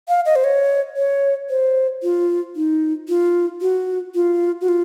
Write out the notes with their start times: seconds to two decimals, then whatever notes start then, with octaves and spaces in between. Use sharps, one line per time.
0.09 F5
0.26 D#5
0.36 C5
0.44 C#5
0.97 C#5
1.50 C5
2.03 F4
2.56 D#4
3.09 F4
3.61 F#4
4.15 F4
4.61 F#4
4.68 F4